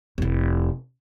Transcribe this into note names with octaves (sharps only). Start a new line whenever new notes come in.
F1 E4